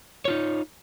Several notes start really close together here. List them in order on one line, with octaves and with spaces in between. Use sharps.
C#5 F4 D#4